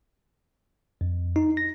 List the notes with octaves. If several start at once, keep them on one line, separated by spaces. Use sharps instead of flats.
F2
D#4
A#6